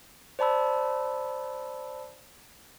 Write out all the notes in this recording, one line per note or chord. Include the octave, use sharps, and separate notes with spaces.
C5 D5 A5 B5 E6